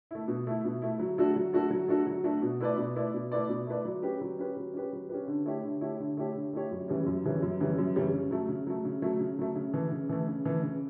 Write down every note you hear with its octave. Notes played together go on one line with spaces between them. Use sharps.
A3 E4
B2
A3 E4
B2
A3 E4
F#3
A3 D4 F#4 A4
F#3
A3 D4 F#4 A4
F#3
A3 D4 F#4 A4
F#3
A3 D4 F#4 A4
B2
A3 E4 B4 D5
B2
A3 E4 B4 D5
B2
A3 E4 B4 D5
B2
A3 E4 B4 D5
F#3
C#4 G4 B4
F#3
C#4 G4 B4
F#3
C#4 G4 B4
F#3
C#4 G4 B4
D3
A3 E4 G4 C#5
D3
A3 E4 G4 C#5
D3
A3 E4 G4 C#5
D3
A3 E4 G4 C#5
F#2
C#3 E3 G3 C#4
F#2
C#3 E3 G3 C#4
F#2
C#3 E3 G3 C#4
F#2
C#3 E3 G3 C#4
C#3
F#3 A3
C#3
F#3 A3
C#3
F#3 A3
C#3
F#3 A3
C#3
E3 A3
C#3
E3 A3
C#3
E3 A3
C#3